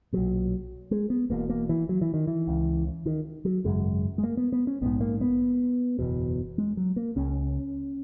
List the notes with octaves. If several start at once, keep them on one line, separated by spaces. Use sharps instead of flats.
B1 A#2 F#3
G#3
B3
E1 E2 B2 A#3
A#3
E3
F#3
E3
D#3
E3
C#2 C#3
D#3
F#3
G#1 F#2 C#3 G#3
G#3
A#3
B3
B3
C#4
A#1 G#2 B3
A#3
B3
F#1 E2 B2
G#3
F#3
A#3
C#2 C#3 C#4